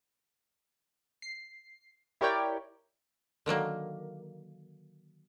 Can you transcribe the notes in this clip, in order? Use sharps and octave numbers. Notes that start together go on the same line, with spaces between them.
C7
E4 G4 A#4 C#5 D5 G5
D3 D#3 F#3 A#3